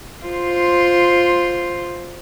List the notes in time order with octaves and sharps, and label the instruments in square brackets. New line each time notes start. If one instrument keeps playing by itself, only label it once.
[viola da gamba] F4 C5